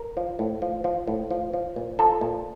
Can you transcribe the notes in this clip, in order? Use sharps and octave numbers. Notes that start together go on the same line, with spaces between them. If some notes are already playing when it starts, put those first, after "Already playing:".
Already playing: A#4
F3
A2
F3
F3
A2
F3
F3
A#2
F3 A4
A#2